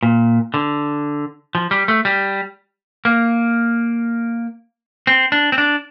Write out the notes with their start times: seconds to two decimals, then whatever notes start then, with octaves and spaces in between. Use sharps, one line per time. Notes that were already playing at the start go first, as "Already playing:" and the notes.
0.03 A#2
0.54 D3
1.55 F3
1.71 G3
1.88 A3
2.05 G3
3.05 A#3
5.07 C4
5.32 D4
5.52 C4
5.58 D4